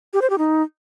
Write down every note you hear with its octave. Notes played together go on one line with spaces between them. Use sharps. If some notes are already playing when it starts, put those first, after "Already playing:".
G4
C5
G4
D#4